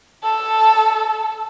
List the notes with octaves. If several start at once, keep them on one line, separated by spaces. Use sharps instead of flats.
A4